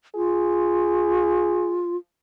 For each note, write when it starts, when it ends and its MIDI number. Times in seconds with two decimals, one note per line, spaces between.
0.15 1.97 65
0.15 1.83 68